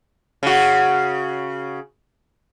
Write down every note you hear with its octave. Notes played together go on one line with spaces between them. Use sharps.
C#3 F#4